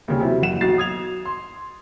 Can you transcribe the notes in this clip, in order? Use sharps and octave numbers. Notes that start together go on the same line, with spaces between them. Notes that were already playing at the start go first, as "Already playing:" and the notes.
D#2 C#3 G3
C3 F#3 E4
F#1 F#5 E7
B1 F#4 A6 C7
D#6 G#6 F7
C6